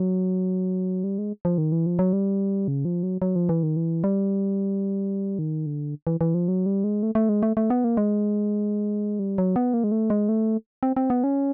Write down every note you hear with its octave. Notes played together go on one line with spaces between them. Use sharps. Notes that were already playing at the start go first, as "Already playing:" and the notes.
Already playing: F#3
G3
G#3
F3
D#3
E3
F3
F#3
G3
C#3
F3
F#3
F#3
F3
E3
D#3
E3
G3
D#3
D3
E3
E3
F3
F#3
G3
G#3
A3
A3
G#3
A3
A3
B3
A#3
G#3
G3
F#3
B3
A#3
G#3
A3
G#3
A3
C4
C4
B3
C#4